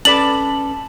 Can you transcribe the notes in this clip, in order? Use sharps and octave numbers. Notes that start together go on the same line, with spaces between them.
C#4 A4 B4 D5 A5 B5 F#7